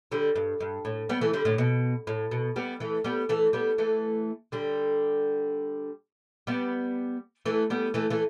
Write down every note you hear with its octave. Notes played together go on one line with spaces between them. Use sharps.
D3 G3
G2
G2
A2
G3 B3
E3 A3
D3 G3
A2 D3
B2
A2
B2
G3 B3
E3 A3
G3 B3
E3 A3
G3 B3
E3 A3
D3 G3
G3 B3
E3 A3
G3 B3
E3 A3
E3 A3